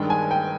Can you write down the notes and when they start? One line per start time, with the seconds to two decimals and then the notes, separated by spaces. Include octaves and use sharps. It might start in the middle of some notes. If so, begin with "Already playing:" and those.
Already playing: G2 D#3 G#3 D4 G5
0.10 G#5
0.31 G5